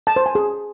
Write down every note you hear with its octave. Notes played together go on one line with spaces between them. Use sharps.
A5
C5
G#5
G#4